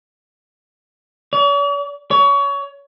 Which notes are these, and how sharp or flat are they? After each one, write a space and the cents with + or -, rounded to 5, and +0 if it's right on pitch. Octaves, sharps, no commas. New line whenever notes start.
C#5 +45
C#5 +25